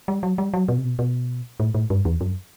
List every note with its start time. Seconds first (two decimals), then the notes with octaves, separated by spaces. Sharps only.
0.08 G3
0.23 F#3
0.38 G3
0.54 F#3
0.68 B2
0.78 C3
0.84 B2
0.99 B2
1.60 A2
1.74 A2
1.90 G2
2.05 E2
2.21 F#2